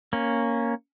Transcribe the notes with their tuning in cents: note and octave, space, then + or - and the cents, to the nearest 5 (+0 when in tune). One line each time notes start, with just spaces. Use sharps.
A#3 +0 C#4 +0